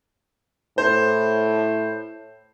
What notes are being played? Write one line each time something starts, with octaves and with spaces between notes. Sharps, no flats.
A2 C5